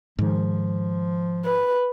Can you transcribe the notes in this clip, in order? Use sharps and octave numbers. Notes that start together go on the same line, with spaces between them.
G#2 D#3 F3
B4